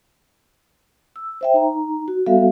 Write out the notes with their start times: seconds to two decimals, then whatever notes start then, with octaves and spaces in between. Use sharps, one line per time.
1.16 E6
1.41 C5 E5 G5
1.54 D#4 A#5
2.08 F#4
2.26 G3 B3 F#4 A4 E5 F5